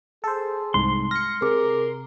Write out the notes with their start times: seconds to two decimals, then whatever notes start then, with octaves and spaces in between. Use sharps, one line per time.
0.24 G#4 A4 C5
0.74 C2 G#2 C6
1.11 F6 A#6 C#7
1.42 C3 G#4 A#4 D6